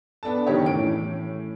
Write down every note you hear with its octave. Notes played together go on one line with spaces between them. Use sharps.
B3 D4 A4 A5
F#1 B2 D#3 G4 C#5
A2 E3 C#4 D7